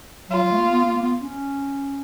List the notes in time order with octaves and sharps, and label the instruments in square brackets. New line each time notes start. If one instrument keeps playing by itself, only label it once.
[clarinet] F#3 [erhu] F4
[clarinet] F#3
A3
A#3
B3
A#3
A#3
B3
C#4